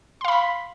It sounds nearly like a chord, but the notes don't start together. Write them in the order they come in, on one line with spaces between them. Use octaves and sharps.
C6 F5 B5 B6